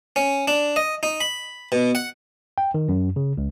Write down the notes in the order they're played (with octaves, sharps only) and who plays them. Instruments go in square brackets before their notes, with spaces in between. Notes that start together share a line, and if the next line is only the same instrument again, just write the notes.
[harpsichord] C#4
D4
D#5
D#4
B5
B2
F#5
[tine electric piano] G5
D#3
F#2
C#3
C#2